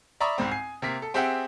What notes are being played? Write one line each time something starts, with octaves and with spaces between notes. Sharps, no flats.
D5 E5 A#5 B5 C#6 D#6
C2 G#2 C4
G#5 C7
C3 A#3 A#4 B6
A4
C4 G4 G#4 E5 F#5 G5